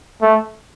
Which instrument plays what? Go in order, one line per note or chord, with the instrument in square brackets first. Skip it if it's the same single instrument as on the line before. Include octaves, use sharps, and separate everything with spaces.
[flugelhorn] A3